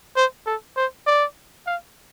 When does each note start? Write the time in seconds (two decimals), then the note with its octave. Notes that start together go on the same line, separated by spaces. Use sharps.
0.16 C5
0.46 A4
0.77 C5
1.07 D5
1.67 F5